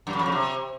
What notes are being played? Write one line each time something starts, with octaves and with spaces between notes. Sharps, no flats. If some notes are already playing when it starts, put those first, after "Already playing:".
F#2
C#3
F2
C#3
C3